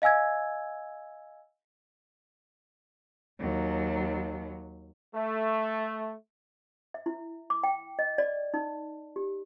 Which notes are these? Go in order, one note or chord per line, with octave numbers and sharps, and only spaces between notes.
D#5 F5 G#5 E6 G#6
D#2 F#3
A3
E5
E4
D6
G5
D#5
D5
D#4
G4